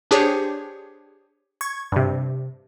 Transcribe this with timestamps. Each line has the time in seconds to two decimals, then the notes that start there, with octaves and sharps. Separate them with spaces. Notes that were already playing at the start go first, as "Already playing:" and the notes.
0.11 D4 G4 G#4 C5 C#5
1.61 C#6 G#6
1.92 G2 C3